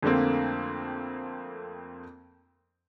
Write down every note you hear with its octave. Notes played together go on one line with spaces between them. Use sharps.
F2 D3 A3 A#3 C4